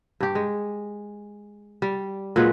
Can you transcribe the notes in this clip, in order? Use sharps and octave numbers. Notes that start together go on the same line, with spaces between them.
G2 G4
G#3
G3
A#2 F#3 G#3 B4